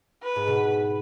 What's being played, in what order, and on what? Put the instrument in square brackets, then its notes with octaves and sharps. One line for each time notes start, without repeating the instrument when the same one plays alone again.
[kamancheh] B4
[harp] G#2
B2